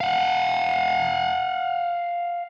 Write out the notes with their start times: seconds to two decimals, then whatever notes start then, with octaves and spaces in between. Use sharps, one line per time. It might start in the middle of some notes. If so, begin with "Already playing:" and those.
0.01 F5 F#5